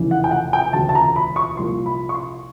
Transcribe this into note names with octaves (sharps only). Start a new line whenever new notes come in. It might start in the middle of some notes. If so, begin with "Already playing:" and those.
Already playing: F1 E2 C#3 E3
F#5
G5
F#5
G5
E1 D2 C#3 A5
A5
A#5
B5
C#6
C2 A#2 F3 C6
B5
C#6
C6